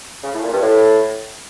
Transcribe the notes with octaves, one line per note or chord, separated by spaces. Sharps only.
C#3
A2
A#2
G2
A2